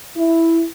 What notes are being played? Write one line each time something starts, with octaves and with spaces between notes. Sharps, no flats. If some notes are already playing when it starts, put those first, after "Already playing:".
E4